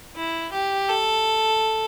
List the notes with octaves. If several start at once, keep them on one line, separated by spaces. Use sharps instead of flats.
E4
G4
A4